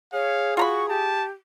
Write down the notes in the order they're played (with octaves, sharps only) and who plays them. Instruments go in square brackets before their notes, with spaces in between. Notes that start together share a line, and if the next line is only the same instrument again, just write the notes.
[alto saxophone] G#4 [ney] C#5 [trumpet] F5
[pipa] F4 A#5 B5 [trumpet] F#4 [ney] C#6
[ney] G4 [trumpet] A5